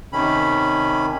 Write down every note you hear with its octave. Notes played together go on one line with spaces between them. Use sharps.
C3 D#3 C#4 B5